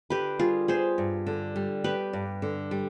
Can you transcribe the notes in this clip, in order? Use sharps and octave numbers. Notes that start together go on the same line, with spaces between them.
D3 G4 B4
G3 F4 G#4
B3 G#4 C5
G2
D3
G3
B3 G4 B4
G2
D3
G3